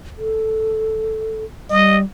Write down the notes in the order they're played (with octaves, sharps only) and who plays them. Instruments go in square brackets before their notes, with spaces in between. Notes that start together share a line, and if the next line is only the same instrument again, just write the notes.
[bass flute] A4
[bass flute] G3 [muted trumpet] D#5